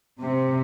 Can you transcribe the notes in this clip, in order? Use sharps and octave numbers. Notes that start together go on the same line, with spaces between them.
C3